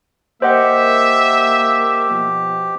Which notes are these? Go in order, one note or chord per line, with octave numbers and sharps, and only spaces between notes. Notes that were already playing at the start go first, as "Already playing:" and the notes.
A#3 G4 C5 D#5 E5 F#5
B2 F3